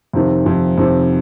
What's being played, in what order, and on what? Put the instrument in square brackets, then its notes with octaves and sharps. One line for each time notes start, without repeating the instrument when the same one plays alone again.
[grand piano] F2 C3 D#3
F2 C3 D#3
F2 C3 D#3